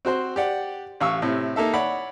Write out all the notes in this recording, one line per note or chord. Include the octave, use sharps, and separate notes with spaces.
C4 F#4 C5 C6
G4 D5 F#5
A1 F5 C#6 E6
A2 C3
A#3 D#4 A4 E5
C#5 D5 F#5 B5